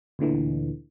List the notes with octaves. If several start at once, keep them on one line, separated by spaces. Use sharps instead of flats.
D2 A#2 D3 E3